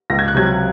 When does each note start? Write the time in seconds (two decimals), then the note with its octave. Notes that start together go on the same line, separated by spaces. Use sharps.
0.10 C#2 A#6
0.19 G#6
0.28 F#6
0.35 C3 F#3 G#6